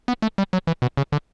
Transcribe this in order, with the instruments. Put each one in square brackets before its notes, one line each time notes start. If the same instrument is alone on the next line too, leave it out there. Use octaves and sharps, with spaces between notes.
[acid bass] B3
A3
G3
F#3
E3
B2
C#3
D3